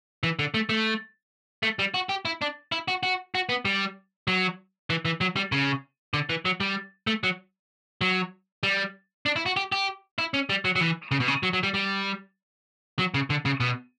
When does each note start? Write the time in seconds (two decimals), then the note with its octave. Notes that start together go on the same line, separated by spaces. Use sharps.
0.23 E3
0.39 D3
0.54 A3
0.69 A3
1.63 A3
1.79 G3
1.94 F#4
2.09 G4
2.25 E4
2.42 D4
2.72 E4
2.88 F#4
3.03 F#4
3.35 F#4
3.49 B3
3.65 G3
4.28 F#3
4.90 E3
5.05 E3
5.21 F#3
5.36 G3
5.52 C#3
6.14 D3
6.29 E3
6.45 F#3
6.60 G3
7.07 A3
7.24 F#3
8.01 F#3
8.63 G3
9.26 D4
9.36 E4
9.46 F#4
9.57 G4
9.72 G4
10.18 E4
10.34 C#4
10.49 G3
10.65 F#3
10.76 F#3
10.80 E3
11.11 C#3
11.20 B2
11.28 C#3
11.43 F#3
11.53 F#3
11.63 G3
11.74 G3
12.99 F#3
13.14 C#3
13.30 D3
13.45 C#3
13.60 B2